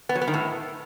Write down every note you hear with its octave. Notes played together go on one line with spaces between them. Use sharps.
B3
F#3
B3
D#3
A2